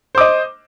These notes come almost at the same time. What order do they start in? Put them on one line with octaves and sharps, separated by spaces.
C5 D6 D#5